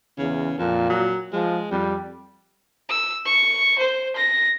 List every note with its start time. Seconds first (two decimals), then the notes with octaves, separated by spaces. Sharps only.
0.18 E2 C#3
0.58 F2 A#2
0.90 F#3
1.33 F3 G#3
1.71 F2 G3
2.89 E6
3.25 C#6
3.78 C5
4.16 A#6